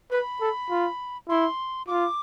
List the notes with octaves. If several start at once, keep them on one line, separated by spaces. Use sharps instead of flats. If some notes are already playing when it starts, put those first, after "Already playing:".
B4 B5
A4
F4
E4 C6
F4 D6